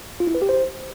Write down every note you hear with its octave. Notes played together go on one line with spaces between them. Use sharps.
F4
E4
B4
G4
C5